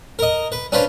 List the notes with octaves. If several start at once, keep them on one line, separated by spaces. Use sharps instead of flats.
A#4 D#5
B4
C#4 D4 B4 C5 F5